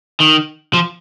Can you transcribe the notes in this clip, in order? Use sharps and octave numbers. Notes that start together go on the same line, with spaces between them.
D#3
F3